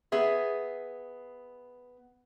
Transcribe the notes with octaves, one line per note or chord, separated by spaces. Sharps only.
B3 G#4 E5